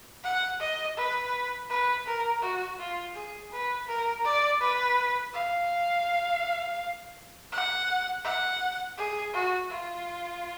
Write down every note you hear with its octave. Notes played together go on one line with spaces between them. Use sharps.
F#5
D#5
B4
B4
A#4
F#4
F4
G#4
B4
A#4
D5
B4
F5
F#5
F#5
G#4
F#4
F4